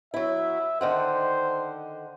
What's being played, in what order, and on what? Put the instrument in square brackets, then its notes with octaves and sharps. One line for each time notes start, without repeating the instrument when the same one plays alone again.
[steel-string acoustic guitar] F#3 E4 [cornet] E5
[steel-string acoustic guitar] D3 D#3 F#5 [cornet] C5